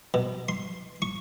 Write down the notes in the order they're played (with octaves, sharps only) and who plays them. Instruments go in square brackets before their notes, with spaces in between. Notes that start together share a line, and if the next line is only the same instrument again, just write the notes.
[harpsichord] B2
C6
C#6